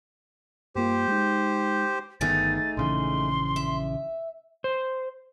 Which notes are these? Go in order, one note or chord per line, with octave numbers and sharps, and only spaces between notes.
G2 A#3 F4 G4 C5
G#3 D#4
G1 D#3 A3 B3 D#4 G#4 A6
A#1 C#3 E3 C6
E5
C5